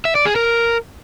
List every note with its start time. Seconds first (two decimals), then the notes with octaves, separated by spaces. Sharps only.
0.05 E5
0.15 D5
0.26 G#4
0.36 A#4